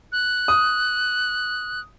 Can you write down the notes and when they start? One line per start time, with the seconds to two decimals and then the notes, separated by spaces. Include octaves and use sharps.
0.12 F#6
0.48 D#6